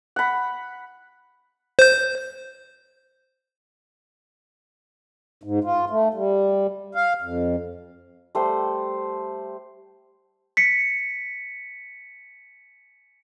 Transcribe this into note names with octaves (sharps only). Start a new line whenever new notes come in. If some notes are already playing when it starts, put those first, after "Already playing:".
F#5 B5
C5 G6
G#2
F4
A3
G3
F5
F2
G3 A3 C5
B6 C#7